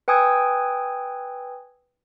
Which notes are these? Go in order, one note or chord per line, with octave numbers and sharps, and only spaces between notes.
B4 G5 G#5 D#6 E6 G#6